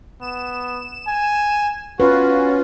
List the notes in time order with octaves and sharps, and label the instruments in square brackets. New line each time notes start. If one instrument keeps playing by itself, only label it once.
[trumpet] B3 [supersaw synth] E7
[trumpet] G#5
[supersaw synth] C#4 F4 [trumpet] F#4 [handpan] B4